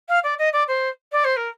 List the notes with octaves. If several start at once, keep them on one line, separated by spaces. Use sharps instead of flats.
F5
D5
D#5
D5
C5
D5
C5
A#4